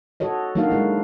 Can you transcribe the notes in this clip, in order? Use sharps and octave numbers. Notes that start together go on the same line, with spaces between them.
F#4 A4 C#5 D#5
F#3 A#3 D4 D#4 F#4 F5
F#3 G#3 E4